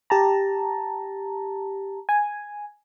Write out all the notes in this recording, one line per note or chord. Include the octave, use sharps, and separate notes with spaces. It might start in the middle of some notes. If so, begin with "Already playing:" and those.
G4 A5 A#5
G#5